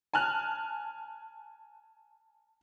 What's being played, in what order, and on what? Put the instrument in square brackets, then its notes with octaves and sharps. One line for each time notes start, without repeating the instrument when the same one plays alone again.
[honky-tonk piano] G#5 A5 F6 F#6